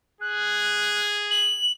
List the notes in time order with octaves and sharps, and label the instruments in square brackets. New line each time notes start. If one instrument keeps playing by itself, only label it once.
[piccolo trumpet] G#4 [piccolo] F#6
[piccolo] F#7